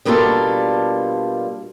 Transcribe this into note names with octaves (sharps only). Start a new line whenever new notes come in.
B2 G3 A#3 D4 F4 A4